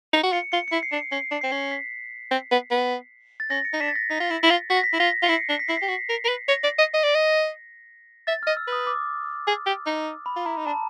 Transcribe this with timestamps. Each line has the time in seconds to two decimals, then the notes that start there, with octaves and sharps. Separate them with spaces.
0.13 D#4
0.23 F#4
0.33 F4 C#7
0.52 F4 C#7
0.68 E4 C#7
0.83 C7
0.92 D4
0.97 C#7
1.12 C#4 C7
1.31 D4
1.41 C4 C7
1.51 C#4
1.71 B6
2.31 C4
2.51 B3
2.71 B3
3.40 A6
3.50 C#4 A#6
3.65 C#7
3.73 D#4
3.80 D4 B6
3.88 A6
3.96 A#6
4.10 D#4 A#6
4.20 F4
4.30 E4
4.43 E4
4.50 F4
4.70 F#4 B6
4.77 A#6
4.84 B6
4.93 E4
4.99 F4 A#6
5.23 F4
5.26 C#7
5.29 E4 C7
5.49 D4
5.59 B6
5.68 E4 C7
5.77 B6
5.82 G4
5.88 F#4 B6
6.09 A#4
6.24 A#4
6.29 B4
6.48 C#5 A#6
6.63 D5
6.78 D#5
6.94 D#5
7.03 D5
7.15 D#5
8.27 E5 A6
8.43 D#5 F6
8.57 E6
8.67 B4
8.72 D#6
8.87 D6
9.47 G#4
9.66 G4
9.86 D#4
10.26 B5
10.36 F4
10.46 E4 A#5
10.57 D#4
10.66 D4 A5